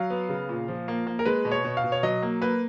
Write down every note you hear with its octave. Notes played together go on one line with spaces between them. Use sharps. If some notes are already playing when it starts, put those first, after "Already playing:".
Already playing: F#3 F5
B3
C#3
A#2
F3
A#3
A#3
A#4
G#3 B4
B2
C#5
B2
F5
B2
C#5
F#3 D#5
A#3
A#3 B4